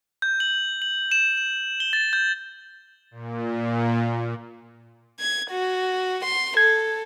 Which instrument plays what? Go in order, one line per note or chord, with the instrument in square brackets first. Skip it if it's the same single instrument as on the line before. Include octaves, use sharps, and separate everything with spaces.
[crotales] G6
F#7
F#7
E7
E7
G7
A6
G6
[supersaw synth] A#2
[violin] G#6
F#4
C6
[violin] A4 [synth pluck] G#6